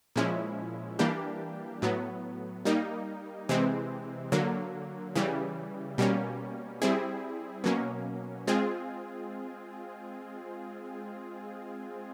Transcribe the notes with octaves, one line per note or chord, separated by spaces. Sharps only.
A#2 F3 G#3 C#4 E4
E3 G3 A#3 D4 G4
A2 F#3 B3
G3 A#3 D#4
C3 E3 G#3 C4
D3 F#3 A#3
C#3 E3 G3
B2 G3 A#3 C#4
G3 C4 E4 G#4
B2 F#3 A#3 C#4
G#3 C4 F4 G#4